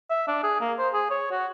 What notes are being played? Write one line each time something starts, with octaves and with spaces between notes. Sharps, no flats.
E5
D4
G#4
A#3
C5
G#4
C#5
F#4